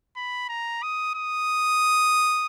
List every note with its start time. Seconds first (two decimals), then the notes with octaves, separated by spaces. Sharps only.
0.16 B5
0.49 A#5
0.83 D#6
1.15 D#6